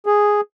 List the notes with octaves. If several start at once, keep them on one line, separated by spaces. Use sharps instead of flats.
G#4